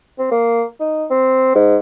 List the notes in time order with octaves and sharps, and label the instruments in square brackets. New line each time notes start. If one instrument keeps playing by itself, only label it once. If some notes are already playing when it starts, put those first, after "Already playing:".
[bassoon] C4
A#3
D#4
C4
G#2